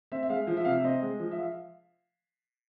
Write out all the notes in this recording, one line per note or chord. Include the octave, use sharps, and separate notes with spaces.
C4 E5
E5
G#3 F5
F3
E5
C3 F5
E5
C4 D#5
G#3
F3
E5
F5